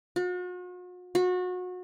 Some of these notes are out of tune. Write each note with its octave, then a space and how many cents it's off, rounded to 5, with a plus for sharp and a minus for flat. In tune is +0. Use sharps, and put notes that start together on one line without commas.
F#4 -45
F#4 -30